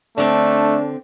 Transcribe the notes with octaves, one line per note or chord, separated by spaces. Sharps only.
D3 A3 C4 D4